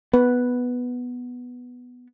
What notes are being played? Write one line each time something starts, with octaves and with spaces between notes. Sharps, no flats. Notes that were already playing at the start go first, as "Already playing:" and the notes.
B3 B4